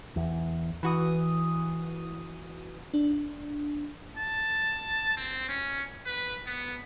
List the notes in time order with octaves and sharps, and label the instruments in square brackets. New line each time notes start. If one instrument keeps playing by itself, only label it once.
[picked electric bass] E2
[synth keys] E3 F#4 D#6
[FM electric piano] D4
[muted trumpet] A5
C4
C#4
B4
B3